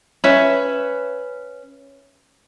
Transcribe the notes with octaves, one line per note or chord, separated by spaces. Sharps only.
C#4 B4 E5